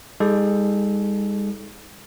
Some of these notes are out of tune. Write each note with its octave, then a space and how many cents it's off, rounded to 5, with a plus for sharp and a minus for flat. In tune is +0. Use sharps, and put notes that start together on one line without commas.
G#3 -40 D#4 +25 A4 -25